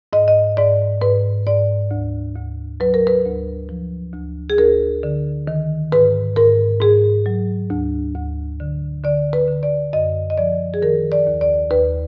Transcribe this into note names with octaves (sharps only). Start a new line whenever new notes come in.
G#2 D#5
D#5
G#2 D5
G#2 B4
G#2 D5
D2
D2
F#3 B4
A#4
B4
D2
F3
D2
G#4
D2 A#4
D3
D#3
G#2 B4
G#2 A#4
G#2 G#4
F#3
D2
D2
D3
D3 D5
B4
D3
D5
F#2 D#5
D#5
F3 D5
G#4
D#3 A#4
D5
D#2
D5
D#2 B4